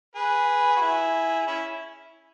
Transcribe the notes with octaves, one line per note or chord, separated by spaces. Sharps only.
G#4 B4
F#4
E4 G#4
C#4 E4